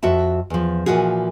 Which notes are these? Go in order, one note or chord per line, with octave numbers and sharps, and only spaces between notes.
F2 F#4 E5 A5
E2 F3
A#2 E3 F3 F#4 G#4